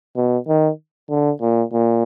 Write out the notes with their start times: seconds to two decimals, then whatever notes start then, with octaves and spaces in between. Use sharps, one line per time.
0.16 B2
0.48 D#3
1.10 D3
1.41 A#2
1.73 A#2